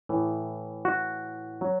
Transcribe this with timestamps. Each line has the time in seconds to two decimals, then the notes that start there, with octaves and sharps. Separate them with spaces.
0.09 A2 E3
0.85 F#4
1.61 F#3